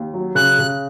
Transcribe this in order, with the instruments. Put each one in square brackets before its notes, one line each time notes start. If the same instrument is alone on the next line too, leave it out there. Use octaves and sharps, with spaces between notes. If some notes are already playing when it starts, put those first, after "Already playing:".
Already playing: [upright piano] D#2
F#3
[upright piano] C#3 [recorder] F#6
[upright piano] C#3